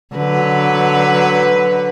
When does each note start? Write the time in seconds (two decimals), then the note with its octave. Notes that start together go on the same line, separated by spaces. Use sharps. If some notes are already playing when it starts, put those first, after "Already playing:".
0.15 D3 F#3 B4